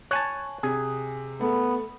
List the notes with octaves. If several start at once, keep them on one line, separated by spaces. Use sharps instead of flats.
C#5 G#5 A5 F#6
C3 G#4
A3 B3